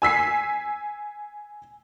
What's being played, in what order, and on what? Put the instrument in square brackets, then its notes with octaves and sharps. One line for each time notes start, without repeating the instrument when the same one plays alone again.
[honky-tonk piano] G#5 E6 B6 C7